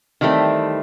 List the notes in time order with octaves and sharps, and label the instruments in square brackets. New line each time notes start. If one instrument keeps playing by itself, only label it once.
[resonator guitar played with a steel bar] D#3 E3 G3 A3 C4